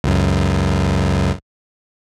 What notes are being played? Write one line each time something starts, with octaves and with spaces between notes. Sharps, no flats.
C#2 F#2